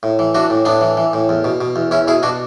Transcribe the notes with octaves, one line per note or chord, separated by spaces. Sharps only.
A2
E3
E3 D4 F#4
A2
A2 B3 D4
E3
E3
A2
E2
B2
B2
E2
E2 C#4 E4
B2 E4 G#4
B2 D4 F#4